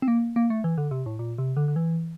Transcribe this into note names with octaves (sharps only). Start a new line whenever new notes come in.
C4
A#3
A#3
A3
E3
D3
C3
A2
A#2
C3
D3
D3
E3